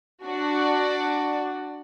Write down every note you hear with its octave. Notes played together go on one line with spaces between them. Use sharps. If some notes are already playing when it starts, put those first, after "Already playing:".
D4 F#4 D5